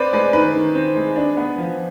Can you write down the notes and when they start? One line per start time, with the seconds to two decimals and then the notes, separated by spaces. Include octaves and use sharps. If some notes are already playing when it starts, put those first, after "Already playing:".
Already playing: C4 B4 D5
0.13 G#3 B4 D5
0.33 D#3 B4
0.55 D#3
0.75 C4
0.96 G#3
1.16 D4
1.37 B3
1.58 F3